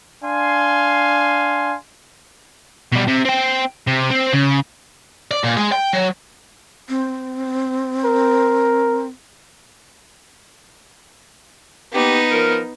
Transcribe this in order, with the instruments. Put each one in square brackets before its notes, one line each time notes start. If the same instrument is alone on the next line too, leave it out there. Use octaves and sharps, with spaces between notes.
[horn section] D4 F5 G#5 C6
[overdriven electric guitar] B2 G3
C3
C4 G5
C3
C4
C#3
[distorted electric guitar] D5
A#2
G#3
G5
F#3
[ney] C4
[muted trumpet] A#4
[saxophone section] A#3 G4 [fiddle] B3 D#4
[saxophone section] F3 A#4